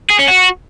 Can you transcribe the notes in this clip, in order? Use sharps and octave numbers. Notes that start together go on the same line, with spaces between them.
G#4
C#4
F#4